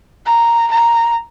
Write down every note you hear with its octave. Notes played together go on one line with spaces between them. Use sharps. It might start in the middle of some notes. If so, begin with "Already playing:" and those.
A#5
A#5